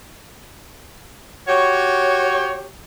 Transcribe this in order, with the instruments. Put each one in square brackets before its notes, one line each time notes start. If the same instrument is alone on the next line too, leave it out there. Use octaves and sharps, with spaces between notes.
[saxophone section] F#4 G4 C#5